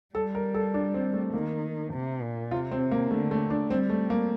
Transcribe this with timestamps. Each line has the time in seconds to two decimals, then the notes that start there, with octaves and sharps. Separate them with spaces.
0.15 G3 A4
0.35 A#4
0.54 A4
0.74 D4
0.94 C4
1.13 A3
1.33 D#3 A#3
1.93 C3
2.22 A#2
2.51 C3 F4
2.71 C4
2.91 A#3
3.11 D3 A3
3.31 A3
3.50 D4
3.70 G3 C4
3.90 A3
4.10 A#3